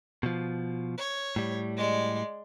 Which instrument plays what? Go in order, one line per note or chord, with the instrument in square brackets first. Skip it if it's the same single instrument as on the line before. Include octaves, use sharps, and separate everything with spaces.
[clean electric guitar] B2 F3
[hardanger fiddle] C#5
[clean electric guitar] A2 G3
[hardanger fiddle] G#3 D5